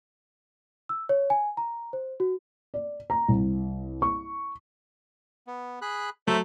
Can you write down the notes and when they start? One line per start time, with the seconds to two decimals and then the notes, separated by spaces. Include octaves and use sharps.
0.89 E6
1.09 C#5
1.30 G#5
1.57 A#5
1.93 C5
2.20 F#4
2.74 D5
3.10 A#5
3.28 C2
4.02 C#6
5.47 B3
5.82 G#4 B5 F#6
6.28 F#3 A3 C5 E5 A#5